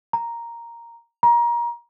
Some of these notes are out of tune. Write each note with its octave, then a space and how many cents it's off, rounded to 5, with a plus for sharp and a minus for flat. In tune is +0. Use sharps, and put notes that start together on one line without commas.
A#5 +0
A#5 +25